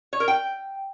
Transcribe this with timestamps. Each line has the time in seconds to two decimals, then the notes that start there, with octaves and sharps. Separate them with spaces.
0.13 C#5
0.20 A#4
0.28 G5